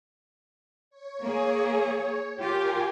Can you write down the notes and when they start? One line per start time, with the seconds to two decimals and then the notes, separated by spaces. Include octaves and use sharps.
0.90 C#5
1.23 A#3 G#4
2.41 F4 G4 A#4 G5 G#5